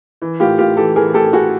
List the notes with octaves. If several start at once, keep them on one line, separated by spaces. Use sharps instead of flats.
E3
A2 F4 G4
A2 F4 G4
E3 G4 A4
E3 G#4 A#4
A2 G4 A4
A2 F#4 G#4